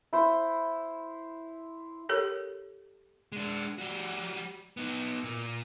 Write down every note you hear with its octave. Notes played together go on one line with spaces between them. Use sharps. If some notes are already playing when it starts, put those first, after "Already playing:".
E4 C5
G4 A4 A#4 C#5
G#3 D4
G3 F#4
B3 D#4
A#2